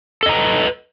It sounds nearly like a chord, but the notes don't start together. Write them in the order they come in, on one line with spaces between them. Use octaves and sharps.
A4 D#5 A#5 B4